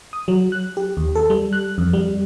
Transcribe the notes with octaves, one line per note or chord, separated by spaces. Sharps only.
D#6
F#3
F#6
G4
D#2
A4
G3
F#6
F2
G3